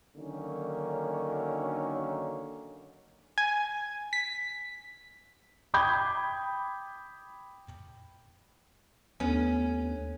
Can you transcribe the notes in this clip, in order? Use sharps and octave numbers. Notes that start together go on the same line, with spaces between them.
D3 D#3 F#3 A#3 C#4
G#5
B6
G5 B5 D6 D#6 G6 G#6
D#2 A3 B3 C#4 D4 A4